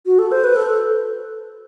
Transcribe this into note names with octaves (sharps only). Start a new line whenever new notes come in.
F#4
A4
C5
B4
A4